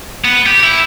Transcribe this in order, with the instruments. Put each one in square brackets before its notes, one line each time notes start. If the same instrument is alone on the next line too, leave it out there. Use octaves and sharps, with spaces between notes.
[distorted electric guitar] B3
G4
E4